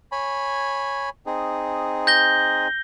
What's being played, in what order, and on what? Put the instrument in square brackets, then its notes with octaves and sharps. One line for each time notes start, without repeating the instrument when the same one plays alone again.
[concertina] C#5 G#5 B5
C4 D#4 G#4
[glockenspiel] G6 A#6 G7